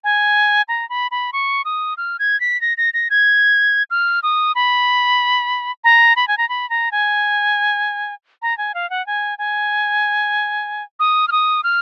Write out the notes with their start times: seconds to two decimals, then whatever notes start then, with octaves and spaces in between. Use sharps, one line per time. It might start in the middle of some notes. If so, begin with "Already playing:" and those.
0.04 G#5
0.68 A#5
0.90 B5
1.11 B5
1.33 C#6
1.65 D#6
1.97 F6
2.19 G#6
2.41 B6
2.61 A#6
2.78 A#6
2.94 A#6
3.10 G#6
3.91 F6
4.23 D#6
4.55 B5
5.84 A#5
6.16 B5
6.28 G#5
6.38 A#5
6.49 B5
6.70 A#5
6.92 G#5
8.42 A#5
8.58 G#5
8.74 F5
8.90 F#5
9.07 G#5
9.38 G#5
11.00 D#6
11.28 F6
11.32 D#6
11.64 F6